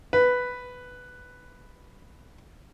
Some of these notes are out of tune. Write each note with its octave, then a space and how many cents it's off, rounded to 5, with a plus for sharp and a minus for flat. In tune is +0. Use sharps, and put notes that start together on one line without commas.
B4 +5